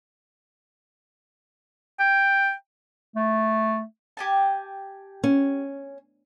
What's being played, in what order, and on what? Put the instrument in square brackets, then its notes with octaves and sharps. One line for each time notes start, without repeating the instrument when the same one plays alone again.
[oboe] G5
[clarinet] A3
[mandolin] G4 G#5 A5
[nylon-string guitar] C#4